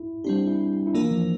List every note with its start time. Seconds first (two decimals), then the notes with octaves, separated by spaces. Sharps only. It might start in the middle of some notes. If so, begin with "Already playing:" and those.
Already playing: E4
0.24 G3 C4 D4 G4
0.47 E4
0.87 E4
0.93 E3 A#3 D4 F4 A#4
1.11 F3